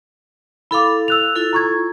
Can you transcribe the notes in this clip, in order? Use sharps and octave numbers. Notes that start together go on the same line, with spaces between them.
E4 A4 F5 B5 D6
E6 F#6 F7
E4 F4 A4
A#5 C#6 G#6